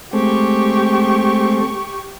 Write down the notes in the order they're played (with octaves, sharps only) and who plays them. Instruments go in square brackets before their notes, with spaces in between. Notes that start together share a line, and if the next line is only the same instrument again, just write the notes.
[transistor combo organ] G#3 A3 C4 [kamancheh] G4 C#6